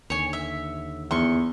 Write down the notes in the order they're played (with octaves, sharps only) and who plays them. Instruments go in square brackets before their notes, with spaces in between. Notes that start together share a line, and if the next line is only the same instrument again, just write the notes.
[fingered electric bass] D#2 D3 [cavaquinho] C#5 G#5
[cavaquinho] E5
[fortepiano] E2 [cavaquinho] C6 C#6